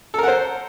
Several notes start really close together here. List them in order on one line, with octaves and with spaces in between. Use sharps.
A4 A#4 F#5 C5